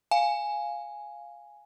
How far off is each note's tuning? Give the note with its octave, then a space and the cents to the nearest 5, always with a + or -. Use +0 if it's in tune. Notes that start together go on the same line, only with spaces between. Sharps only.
F5 +0 G#5 +0